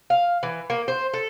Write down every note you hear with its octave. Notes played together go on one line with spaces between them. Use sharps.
F5
E3
A#3
C5
A4